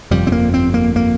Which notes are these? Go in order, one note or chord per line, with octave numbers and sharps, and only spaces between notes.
G1 F2 C3 G3
C4
A#3
C4
A#3
A#3